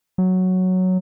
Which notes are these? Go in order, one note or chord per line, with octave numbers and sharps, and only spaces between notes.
F#3